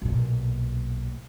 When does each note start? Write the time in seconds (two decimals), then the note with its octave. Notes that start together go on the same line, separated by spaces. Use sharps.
0.02 B1 A#2